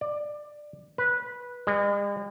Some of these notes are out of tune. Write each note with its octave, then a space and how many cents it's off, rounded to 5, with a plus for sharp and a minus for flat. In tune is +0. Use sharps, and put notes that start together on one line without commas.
D5 +15
B4 -15
G#3 -45